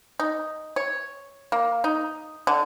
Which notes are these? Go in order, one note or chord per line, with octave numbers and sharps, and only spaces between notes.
D#4
C#5
A#3
D#4
D3